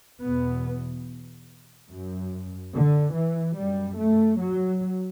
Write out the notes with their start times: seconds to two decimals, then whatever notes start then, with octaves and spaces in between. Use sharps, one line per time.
0.22 E2 B2 B3
1.89 F#2
2.73 D3
3.15 E3
3.56 F#2 G3
3.98 A3
4.41 F#3